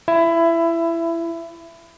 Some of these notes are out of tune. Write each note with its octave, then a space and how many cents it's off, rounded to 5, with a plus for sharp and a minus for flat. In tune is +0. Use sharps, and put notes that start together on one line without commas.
E4 +20